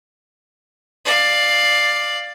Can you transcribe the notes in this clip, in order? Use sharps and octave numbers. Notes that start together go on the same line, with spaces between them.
D5 F5